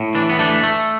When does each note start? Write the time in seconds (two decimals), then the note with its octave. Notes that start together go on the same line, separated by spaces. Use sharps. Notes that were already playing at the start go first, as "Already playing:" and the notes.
Already playing: A2
0.15 E3 D4
0.29 B3
0.39 A3 D4
0.63 A3